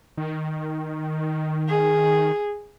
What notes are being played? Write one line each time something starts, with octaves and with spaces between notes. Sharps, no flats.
D#3
G#4